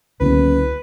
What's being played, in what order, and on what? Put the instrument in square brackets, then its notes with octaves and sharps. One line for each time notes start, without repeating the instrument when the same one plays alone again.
[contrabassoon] F#1 [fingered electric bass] C#2 D3 B3 [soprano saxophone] B4